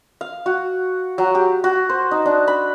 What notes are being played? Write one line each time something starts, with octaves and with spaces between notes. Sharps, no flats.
F5
F#4
F#3
G4
F#4
C5
D#4
D4
B5